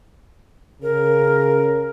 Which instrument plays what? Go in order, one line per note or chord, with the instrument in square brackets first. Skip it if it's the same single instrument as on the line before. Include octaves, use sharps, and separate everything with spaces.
[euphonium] C#3 [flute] A#4